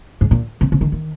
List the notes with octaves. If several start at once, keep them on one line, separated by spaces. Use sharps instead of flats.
G#2
A#2
C3
C3
D#3
D#3